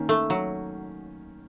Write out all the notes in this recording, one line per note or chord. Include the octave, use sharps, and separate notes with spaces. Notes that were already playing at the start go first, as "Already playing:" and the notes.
Already playing: D#3 A#3 C#4
A3
F#3